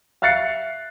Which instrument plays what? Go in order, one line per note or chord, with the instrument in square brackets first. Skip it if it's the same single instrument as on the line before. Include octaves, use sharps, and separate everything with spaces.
[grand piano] E5 F5 F#6 A6 C7 C#7